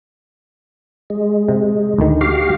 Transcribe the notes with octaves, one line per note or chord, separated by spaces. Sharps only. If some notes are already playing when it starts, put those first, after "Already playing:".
G#3
C3
D2 D#3
F#4 G4 F5